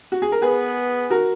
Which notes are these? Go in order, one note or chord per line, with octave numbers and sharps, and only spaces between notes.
F#4
G#4
A#4
B3 G#4 B4
F#4 A#4